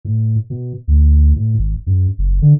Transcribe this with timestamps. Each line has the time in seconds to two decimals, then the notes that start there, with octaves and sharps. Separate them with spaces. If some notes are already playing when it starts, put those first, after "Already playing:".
0.05 A2
0.50 B2
0.88 D2
1.36 A2
1.59 G#1
1.87 F#2
2.18 F#1
2.42 D3